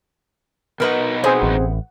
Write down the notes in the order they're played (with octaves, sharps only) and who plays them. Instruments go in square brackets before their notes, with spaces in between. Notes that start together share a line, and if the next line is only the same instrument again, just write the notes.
[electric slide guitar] B2 D#4 F#4 [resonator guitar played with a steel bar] A#4 B4 D#5
[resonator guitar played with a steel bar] B3 [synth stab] C4 G#4 C5
[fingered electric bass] A1